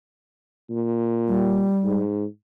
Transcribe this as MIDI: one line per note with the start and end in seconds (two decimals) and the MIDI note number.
0.70 1.72 46
1.28 2.01 55
1.84 2.25 44